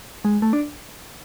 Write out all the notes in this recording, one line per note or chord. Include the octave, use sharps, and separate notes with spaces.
G#3
A3
D4